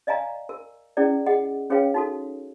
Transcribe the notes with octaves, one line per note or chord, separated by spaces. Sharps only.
D5 D#5 F5 G#5 A#5
A#4
C#4 E4 G#4 D5
G#4 D#5 F#5
C#4 G#4 B4 C#5 F5 G5
D#4 F#4 A4